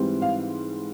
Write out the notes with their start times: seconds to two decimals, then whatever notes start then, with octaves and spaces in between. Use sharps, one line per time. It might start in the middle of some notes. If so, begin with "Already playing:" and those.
Already playing: G#2 E3 G3 C4
0.22 F5